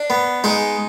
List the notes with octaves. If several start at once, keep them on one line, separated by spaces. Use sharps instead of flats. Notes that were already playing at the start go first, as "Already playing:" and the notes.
Already playing: D4
B3
G#3 D#4